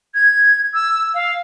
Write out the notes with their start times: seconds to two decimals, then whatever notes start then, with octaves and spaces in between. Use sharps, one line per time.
0.15 G#6
0.74 E6
1.14 F5